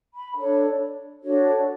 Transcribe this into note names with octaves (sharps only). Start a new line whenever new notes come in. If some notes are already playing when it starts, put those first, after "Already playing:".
B5
D4 A4 C#5
D4 F#4 A4 C#5